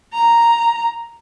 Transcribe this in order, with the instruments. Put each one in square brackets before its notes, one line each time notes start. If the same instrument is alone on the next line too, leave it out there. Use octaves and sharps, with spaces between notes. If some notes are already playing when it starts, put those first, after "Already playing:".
[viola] A#5